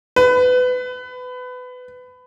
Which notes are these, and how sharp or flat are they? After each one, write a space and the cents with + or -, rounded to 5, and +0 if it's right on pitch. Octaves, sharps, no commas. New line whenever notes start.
B4 +25